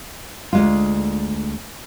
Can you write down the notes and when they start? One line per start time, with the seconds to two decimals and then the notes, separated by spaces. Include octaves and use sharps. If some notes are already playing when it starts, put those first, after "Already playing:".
0.53 D2 G#3 F4